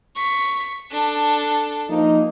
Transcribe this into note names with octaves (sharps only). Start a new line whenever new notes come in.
C#6 B6
D4 A4
F3 A#3 D#4